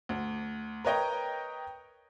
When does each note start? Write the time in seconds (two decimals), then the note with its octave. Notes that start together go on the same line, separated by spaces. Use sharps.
0.09 D2
0.84 A#4 B4 C#5 D#5 G5 A#5